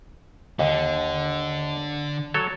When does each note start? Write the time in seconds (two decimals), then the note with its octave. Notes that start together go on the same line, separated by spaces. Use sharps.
0.59 D#2 D3
2.34 F#3 A4 C#5